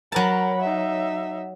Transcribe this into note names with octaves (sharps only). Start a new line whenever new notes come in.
F#3 A#4 A5 B5
D#4 E5